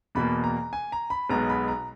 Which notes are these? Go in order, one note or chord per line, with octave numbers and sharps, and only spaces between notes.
E2 B2 A#3 B5
A#5
G#5
A#5
B5
B1 B2 G#3 B3 A#5
B5
A#5